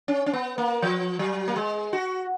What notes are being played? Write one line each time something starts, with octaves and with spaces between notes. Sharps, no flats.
C#4
C#4
B3
A#3
F3
F#3
A#3
G#3
F#4